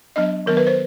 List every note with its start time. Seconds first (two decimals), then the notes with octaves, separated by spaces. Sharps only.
0.16 F#3 B3 D4 D#5
0.46 D#3 F#3 B3 A#4
0.57 B4
0.67 C5